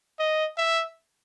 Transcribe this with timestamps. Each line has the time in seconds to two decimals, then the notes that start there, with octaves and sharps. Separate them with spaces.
0.19 D#5
0.57 E5